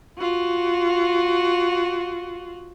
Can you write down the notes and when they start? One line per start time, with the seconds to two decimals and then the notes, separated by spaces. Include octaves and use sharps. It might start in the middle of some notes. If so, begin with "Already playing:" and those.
0.19 F4 F#4